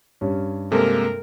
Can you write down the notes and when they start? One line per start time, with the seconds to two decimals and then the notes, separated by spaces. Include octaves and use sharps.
0.21 G2 C#4
0.72 C3 G#3 A#3 A4 A#4